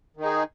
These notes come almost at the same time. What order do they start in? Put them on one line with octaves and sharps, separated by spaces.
D#3 D#4 G#4